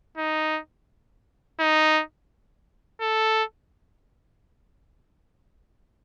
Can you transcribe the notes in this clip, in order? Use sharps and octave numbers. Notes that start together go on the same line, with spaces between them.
D#4
D#4
A4